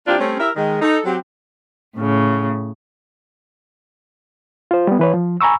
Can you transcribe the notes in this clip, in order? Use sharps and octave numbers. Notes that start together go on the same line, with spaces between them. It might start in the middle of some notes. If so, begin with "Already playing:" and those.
E3 A#3 C4 D4 F4 G4
G3 A3 C4 C#4
E4 G4 A#4 E5
D#3 G#3
D#4 A4
F#3 C4 G4
A2 C#3
F4 C5
G3 B3
E3 B4 C#5
F3
G#5 A#5 B5 C#6 E6